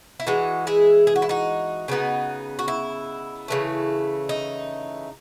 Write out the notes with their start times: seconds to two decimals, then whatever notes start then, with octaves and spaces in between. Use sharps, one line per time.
0.20 E4
0.26 E3 G#3 D#4 F#4
0.67 E4 G#4
1.07 G#4
1.16 F#4
1.22 E4
1.29 D#4 F#4
1.88 C#3 F#3 B3 D#4
2.59 F#4
2.68 E4
3.48 C#3 E3 A3
4.29 D#4